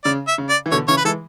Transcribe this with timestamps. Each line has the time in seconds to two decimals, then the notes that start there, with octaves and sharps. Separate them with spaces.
0.04 C#3 D5
0.28 E5
0.38 C#3
0.50 D5
0.66 E3
0.72 B2 D3 C#5
0.88 C#3 E3 C#5
0.97 B4
1.05 E3 G#3 A4